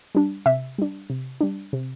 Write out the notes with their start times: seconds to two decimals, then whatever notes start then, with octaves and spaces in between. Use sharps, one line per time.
0.15 G3 D4
0.46 C3 E5
0.78 G3 D4
1.10 C3
1.41 G3 D4
1.73 C3